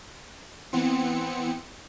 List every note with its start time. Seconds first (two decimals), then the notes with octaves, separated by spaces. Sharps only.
0.72 E3 B3 C4 C#7